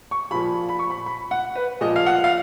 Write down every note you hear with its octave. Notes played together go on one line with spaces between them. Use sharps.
C#6
A#2 F3 B5
B5
C#6
B5
B5
F#5
B4
A#2 F3 D#5
F5
F#5
F5